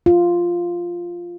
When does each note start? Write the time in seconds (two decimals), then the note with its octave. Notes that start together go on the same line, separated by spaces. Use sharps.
0.06 F4